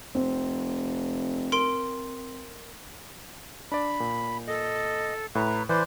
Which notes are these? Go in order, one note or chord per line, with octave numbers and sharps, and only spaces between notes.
F1 C4
A#4 C6 D7
D4 D5 B5
A#2
A4 D#5
A2 B4 A#5
E3 B4 C5 D5 C6